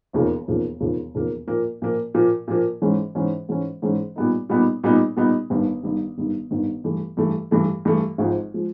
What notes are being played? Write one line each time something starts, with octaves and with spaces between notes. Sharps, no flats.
E1 D#2 C#3 F3 A#3
E1 D#2 C#3 F3 A#3
E1 D#2 C#3 F3 A#3
E1 D#2 C#3 F3 A#3
A#2 F3 A#3
A#2 F3 A#3
A#2 F3 A#3
A#2 F3 A#3
G#2 E3 G#3 C#4
G#2 E3 G#3 C#4
G#2 E3 G#3 C#4
G#2 E3 G#3 C#4
A#2 G3 B3 D#4
A#2 G3 B3 D#4
A#2 G3 B3 D#4
A#2 G3 B3 D#4
G1 G2 D#3
G1 G2 D#3
G1 G2 D#3
G1 G2 D#3
G2 E3 A3
G2 E3 A3
G2 E3 A3
G2 E3 A3
G#1 G#2 F3 G#3
F3 G#3